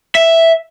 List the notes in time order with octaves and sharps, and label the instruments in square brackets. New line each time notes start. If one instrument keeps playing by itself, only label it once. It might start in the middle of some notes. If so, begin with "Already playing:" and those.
[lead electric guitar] E5